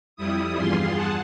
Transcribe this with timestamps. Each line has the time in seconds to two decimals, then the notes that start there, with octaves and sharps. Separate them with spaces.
0.16 F2 G3 E4 D#6
0.57 E2 G2 F4 G#4 C6
0.92 G#4 F#5 A5